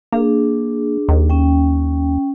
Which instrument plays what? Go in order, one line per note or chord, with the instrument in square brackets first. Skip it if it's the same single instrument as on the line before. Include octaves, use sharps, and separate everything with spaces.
[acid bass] A#3 [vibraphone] D4 G#4
[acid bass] D#2
[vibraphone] C#4 G5